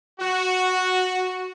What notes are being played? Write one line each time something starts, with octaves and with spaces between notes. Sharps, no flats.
F#4